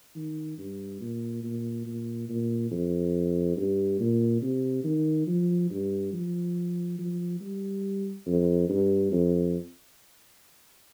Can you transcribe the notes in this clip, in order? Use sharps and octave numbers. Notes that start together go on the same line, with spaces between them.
D#3
G2
A#2
A#2
A#2
A#2
F2
G2
A#2
C3
D#3
F3
G2
F3
F3
G3
F2
G2
F2